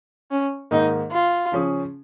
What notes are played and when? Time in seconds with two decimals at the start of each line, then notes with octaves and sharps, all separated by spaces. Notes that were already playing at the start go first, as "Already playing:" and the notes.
0.31 C#4
0.71 G#2 D#3 A#3 D#4
1.11 F4
1.52 C#3 F3 C#4 G#4